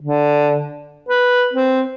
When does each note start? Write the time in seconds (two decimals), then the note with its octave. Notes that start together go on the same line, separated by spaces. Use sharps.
0.01 D3
1.09 B4
1.54 C4